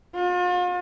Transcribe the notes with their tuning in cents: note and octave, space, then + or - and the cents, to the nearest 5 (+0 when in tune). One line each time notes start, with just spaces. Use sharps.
F4 +40